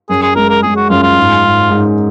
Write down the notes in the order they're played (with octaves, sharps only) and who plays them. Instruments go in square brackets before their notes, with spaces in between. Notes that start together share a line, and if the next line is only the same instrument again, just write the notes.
[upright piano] F#2 [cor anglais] G#4
[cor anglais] G#4
[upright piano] G#3 [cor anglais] A#4
[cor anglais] A#4
[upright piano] G#3 [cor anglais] G#4
[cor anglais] F#4
[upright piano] F#2 [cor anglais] F4
[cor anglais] F4
[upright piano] G#2
G#2
G#2